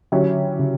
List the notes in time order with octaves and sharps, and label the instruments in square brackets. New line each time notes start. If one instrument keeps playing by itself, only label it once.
[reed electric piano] D3 [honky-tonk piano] F#3 C#4 E4 G4 C#5
[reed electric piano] C#3